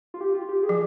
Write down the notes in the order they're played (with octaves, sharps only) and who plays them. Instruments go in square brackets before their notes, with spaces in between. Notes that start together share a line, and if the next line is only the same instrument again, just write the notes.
[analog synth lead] F4
G4
F4
G4
G#4
[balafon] F3